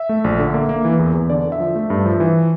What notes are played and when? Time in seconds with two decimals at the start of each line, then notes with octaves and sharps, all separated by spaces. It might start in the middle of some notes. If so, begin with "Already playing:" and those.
Already playing: E5
0.09 A3
0.24 A#1
0.39 D3
0.54 A#3
0.69 A#3
0.85 E3
0.99 E2
1.14 E2
1.30 D3 D5
1.45 D3
1.52 E5
1.60 F3
1.75 A3
1.90 G2
2.06 F3
2.20 E3